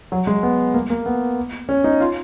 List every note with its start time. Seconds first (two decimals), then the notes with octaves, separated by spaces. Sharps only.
0.12 F#3
0.27 G#3
0.43 B3
0.74 A#3
0.90 A#3
1.06 B3
1.69 C#4
1.84 D#4
2.00 F4